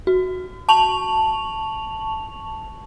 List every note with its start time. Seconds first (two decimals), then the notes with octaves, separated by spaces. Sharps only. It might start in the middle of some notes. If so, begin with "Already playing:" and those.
0.07 F#4
0.69 A5 C#6 F7 F#7